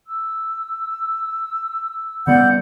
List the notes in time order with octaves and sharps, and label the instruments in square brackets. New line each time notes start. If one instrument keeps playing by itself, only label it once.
[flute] E6
[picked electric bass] C#3 G3 B3 [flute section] D5 F#5 G6